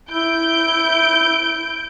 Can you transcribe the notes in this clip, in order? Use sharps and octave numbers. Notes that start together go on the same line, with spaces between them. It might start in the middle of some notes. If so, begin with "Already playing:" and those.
E4 G6 D7